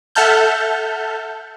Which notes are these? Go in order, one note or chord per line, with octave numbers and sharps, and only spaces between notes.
A4 E5 F#5 A5 F6 G6